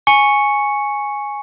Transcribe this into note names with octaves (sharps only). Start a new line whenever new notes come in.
G#5 C#6 C#7